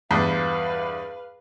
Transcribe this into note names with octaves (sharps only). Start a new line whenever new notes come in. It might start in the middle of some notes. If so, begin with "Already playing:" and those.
E2 G2 B4 F5